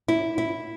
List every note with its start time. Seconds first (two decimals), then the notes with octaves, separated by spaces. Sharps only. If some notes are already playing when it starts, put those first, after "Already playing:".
0.08 E4
0.38 E4